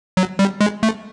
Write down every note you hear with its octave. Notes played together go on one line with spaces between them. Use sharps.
F#3
G3
G#3
A3